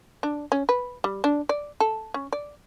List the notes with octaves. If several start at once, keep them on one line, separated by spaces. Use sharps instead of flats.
D4
C#4
B4
G3
D4
D5
A4
C#4
D5